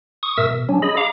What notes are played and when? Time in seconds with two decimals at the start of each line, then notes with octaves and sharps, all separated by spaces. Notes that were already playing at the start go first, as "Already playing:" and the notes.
0.23 C#6 D#6
0.38 G#2 B2 A#4 E5 E6
0.51 B2
0.69 F#3 C#4 D4
0.82 G#4 D#5 B5
0.97 F5 A#5 D6